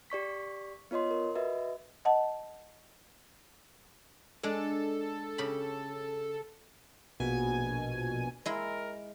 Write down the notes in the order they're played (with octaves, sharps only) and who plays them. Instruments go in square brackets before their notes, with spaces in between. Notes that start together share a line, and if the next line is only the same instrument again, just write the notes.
[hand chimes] G4 D5 C#6 B6
B3 F4 C#5 D#5 C6
A#4
F#4 B4 D#5 E5
[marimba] D#5 F#5 A5
[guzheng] G#3 D4 [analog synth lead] A4
[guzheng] C#3 G4 B5
[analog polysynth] A#1 B2 G#5
[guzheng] G#3 E4 [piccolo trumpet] A#4